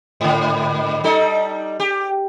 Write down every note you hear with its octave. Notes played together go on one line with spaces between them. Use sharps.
G#2 D3
G3 D#4 A4
G4